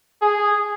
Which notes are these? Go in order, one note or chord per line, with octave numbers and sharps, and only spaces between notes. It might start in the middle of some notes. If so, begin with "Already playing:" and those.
G#4